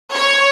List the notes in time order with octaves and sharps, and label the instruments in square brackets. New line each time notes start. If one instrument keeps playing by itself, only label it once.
[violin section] C#5